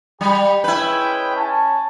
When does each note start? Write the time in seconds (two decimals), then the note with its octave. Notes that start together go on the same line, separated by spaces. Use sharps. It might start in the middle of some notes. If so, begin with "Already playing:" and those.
0.21 G3 G4 B5
0.64 G#3 C#4 E4 B4 G5
1.36 C#4 G#5 A5